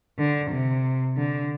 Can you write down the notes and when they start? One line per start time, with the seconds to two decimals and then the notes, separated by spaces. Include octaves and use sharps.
0.18 D3
0.51 C3
1.17 D3